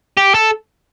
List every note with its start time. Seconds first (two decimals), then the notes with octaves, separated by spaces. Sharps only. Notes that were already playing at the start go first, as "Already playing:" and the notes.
0.17 G4
0.34 A4